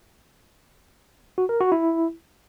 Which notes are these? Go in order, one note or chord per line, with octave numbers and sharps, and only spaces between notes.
F#4
A#4
F#4
E4